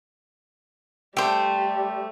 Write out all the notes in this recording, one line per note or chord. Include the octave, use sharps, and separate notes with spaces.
G3 A3 G4 C5